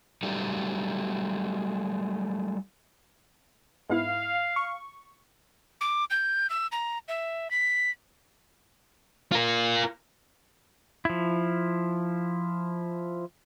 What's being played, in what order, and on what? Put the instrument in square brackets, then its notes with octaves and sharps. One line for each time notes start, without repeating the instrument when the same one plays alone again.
[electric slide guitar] F#3 G3 A3 D#4 G4
[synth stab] G#2 B3 E4 [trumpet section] F5
[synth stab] C#6
[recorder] D6
G6
E6
A#5
E5
B6
[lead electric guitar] F4 A#4
[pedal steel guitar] F3 E4